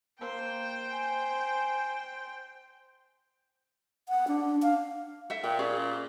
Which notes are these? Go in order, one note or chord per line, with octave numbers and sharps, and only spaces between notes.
A#3 C5 G5
G#5
F#5
D4
F5
A4 E5
A#2 G5
C#4 G#4 D5